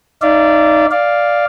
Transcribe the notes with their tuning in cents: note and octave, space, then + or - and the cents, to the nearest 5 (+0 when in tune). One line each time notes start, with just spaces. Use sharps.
D#4 +0 D5 -10 F5 -45
D5 +0 F5 +0